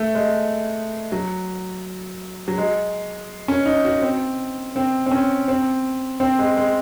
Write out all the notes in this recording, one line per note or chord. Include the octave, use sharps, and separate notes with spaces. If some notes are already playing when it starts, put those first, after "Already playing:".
Already playing: A3
G#3
F#3
F#3
G#3
C#4
D#4
F#4
C4
C4
C4
C#4
C4
C4
G#3
G#3